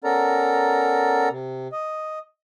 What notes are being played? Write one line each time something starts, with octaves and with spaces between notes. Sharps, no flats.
B3 C#4 A4 A#4 D5 A#5
C3
D#5